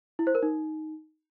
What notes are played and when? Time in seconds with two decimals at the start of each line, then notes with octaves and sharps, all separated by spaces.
0.19 E4
0.27 C5
0.35 A#4
0.43 D#4